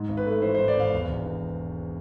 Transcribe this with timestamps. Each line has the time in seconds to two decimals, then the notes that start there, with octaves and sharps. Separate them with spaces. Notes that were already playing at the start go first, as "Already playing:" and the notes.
Already playing: G#2
0.09 G#1
0.17 B4
0.26 A3
0.42 E3 C5
0.55 C5
0.59 G#2
0.68 D5
0.76 G#1 F5
0.92 E2
1.09 E1
1.25 E3